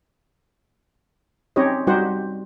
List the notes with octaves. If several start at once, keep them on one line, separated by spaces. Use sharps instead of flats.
C4 C#4 D#4 G4 C#5 D#5
G3 D#4 F#4 G4 C5 F#5